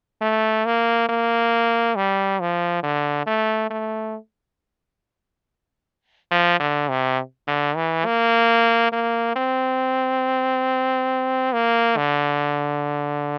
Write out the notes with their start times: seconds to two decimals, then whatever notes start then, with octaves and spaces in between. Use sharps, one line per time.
0.21 A3
0.65 A#3
1.09 A#3
1.96 G3
2.40 F3
2.83 D3
3.27 A3
3.70 A3
6.31 F3
6.60 D3
6.89 C3
7.47 D3
7.76 E3
8.05 A#3
8.92 A#3
9.36 C4
11.53 A#3
11.97 D3